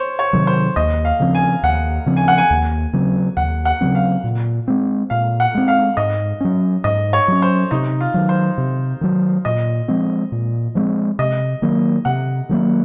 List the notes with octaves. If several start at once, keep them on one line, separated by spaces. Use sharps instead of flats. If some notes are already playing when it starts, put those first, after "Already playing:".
Already playing: C5 C#5
C#5
C3 D#3 F#3
C5
D#2 D#5
F5
C#3 F3 C4
G#5
D#2 F#5
C#3 F3 C4
G#5
F#5
G#5
D#2
C#3 F#3 C4
D#2 F#5
F#5
C#3 F#3 C4
F5
A#2
G#3 C4
A#2 F5
F#5
G#3 C4
F5
G#2 D#5
F#3 C#4
G#2 D#5
C#5
F#3 C#4
C5
C3 D#4
F4
D#3 F#3
C5
C3
D#3 F#3
A#2 D#5
F3 G#3 C4
A#2
F3 G#3 C4
C3 D#5
D#3 F#3 A#3
C3 F#5
D#3 F#3 A#3